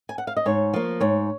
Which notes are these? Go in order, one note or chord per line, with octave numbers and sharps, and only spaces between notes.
G#5
F#5
F5
D#5
G#2 C#5
F3 A#3
G#2 C#5